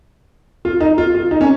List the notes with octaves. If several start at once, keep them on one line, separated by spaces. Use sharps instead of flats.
F4
D#4
F4
F4
D#4
C#4